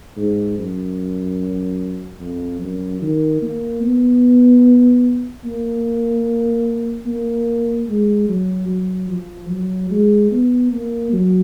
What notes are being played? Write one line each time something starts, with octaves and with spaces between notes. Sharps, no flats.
G#2
F#2
F2
F#2
D#3
A#3
B3
A#3
A#3
G#3
F#3
F#3
F3
F#3
G#3
B3
A#3
F#3